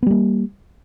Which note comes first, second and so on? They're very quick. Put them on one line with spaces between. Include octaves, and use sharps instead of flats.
B3 G3 A#3